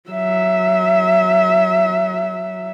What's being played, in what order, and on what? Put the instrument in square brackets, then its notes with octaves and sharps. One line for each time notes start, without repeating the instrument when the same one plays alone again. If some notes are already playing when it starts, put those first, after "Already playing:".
[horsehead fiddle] F#3 E5